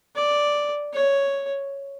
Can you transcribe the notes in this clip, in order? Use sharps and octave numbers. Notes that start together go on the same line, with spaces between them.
D5
C#5